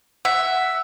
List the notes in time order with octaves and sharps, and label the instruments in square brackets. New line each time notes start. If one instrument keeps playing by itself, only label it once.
[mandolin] E5 [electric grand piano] F#5